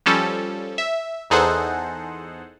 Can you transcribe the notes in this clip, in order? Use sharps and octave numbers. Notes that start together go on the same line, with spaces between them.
F3 G3 C#4 A4
E5
E2 D#4 G#4 A4 C5 F#5